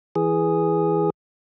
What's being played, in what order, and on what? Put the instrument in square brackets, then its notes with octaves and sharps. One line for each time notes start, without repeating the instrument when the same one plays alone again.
[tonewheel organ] E3 G#4